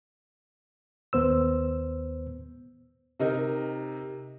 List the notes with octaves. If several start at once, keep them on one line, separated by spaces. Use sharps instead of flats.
D#2 B3 C5 E6
C3 D#4 A#4